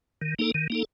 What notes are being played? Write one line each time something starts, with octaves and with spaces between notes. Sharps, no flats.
D#3
A#3 D#4 A4
D#3
A#3 D#4 A4